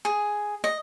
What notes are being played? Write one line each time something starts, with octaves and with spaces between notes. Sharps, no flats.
G#4
D#5